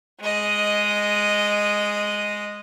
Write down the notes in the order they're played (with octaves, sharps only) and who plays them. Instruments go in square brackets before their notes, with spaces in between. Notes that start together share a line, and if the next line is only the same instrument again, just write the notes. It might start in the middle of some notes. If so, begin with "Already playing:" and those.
[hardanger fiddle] G#3 D#5